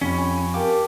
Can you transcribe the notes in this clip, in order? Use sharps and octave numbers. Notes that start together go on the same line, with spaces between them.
F2 C#4 G4 B5
G#5 C#6
G4 A#4 F5 G5 A5 D6